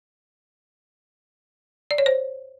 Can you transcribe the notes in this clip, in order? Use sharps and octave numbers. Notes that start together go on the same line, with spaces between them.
D5
C#5
C5